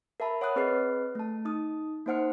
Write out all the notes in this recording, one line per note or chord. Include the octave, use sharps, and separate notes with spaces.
A#4 E5 A5 B5
C#5 F#5 B5 D#6 F#6
C4 G#4 B4 D#5 F#6 C7
A3 A5
D#4 D#6
A#3 D#4 C5 F#5 F6 C#7